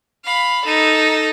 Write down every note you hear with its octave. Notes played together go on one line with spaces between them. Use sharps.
F5 B5
D#4 A4